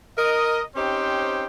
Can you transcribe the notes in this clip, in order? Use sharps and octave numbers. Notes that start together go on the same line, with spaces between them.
A#4 D#5
C4 C#4 D#4 G4 C5 G5